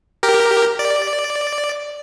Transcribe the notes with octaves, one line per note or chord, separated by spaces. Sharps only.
G4 A#4
D5